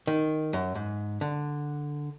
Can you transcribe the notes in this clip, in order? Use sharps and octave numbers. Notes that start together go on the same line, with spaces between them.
D#3
F#2
G#2
D3